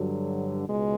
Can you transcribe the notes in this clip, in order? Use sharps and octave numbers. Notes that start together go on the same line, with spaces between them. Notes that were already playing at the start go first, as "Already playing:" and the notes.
Already playing: G2 D3 F#3
C#2 B2 G#3